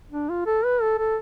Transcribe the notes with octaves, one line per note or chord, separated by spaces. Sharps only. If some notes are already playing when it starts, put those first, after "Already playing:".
D4
F4
A4
B4
A4
A4